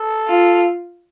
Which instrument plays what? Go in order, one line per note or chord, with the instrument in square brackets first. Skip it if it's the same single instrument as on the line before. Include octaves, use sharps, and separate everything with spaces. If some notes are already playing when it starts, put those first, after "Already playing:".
Already playing: [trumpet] A4
[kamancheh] F4